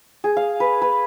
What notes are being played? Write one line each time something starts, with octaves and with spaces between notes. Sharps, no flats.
G#4
F5
B4
B4